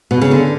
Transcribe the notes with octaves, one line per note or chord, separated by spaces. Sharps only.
B2
C#3
D3